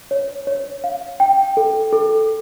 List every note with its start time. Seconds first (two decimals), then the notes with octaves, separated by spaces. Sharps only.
0.11 C#5
0.47 C#5
0.84 F5
1.20 G5
1.57 A4
1.92 A4